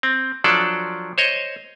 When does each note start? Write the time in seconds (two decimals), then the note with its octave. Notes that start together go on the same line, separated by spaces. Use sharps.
0.03 C4
0.44 F3 F#3 D4 A4 D5
1.18 C5 C#5 D#5